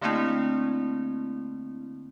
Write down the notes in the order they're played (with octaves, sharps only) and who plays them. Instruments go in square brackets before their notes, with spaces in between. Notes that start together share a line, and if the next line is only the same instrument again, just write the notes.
[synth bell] D3 A3 A#3 C4 D4 E4